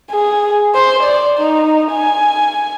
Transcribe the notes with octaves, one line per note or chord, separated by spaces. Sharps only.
G#4
C5
D5
D#4
G#5